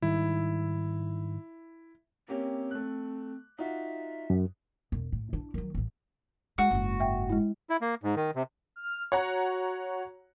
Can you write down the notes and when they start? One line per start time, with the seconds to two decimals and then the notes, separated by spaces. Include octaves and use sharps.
0.02 G#2 D#3 G3 E4
2.28 A#3 C4 C#4 G4
2.71 A3 F#6
3.59 D#4 F4 F#4 E5
4.30 F#2
4.92 E1
5.12 A2
5.33 D4 E4
5.54 D#3 F#3
5.75 A1 E3
6.58 G#3 F#4
6.71 F#1 G#2
7.00 E5 G5
7.30 G#3 E4
7.70 E4
7.81 A#3
8.03 G#2
8.16 D#3
8.35 C3
8.76 F6
9.12 F#4 C#5 F#5 A#5